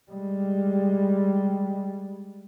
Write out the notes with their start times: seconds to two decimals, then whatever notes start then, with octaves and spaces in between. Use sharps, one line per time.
0.11 G3 G#3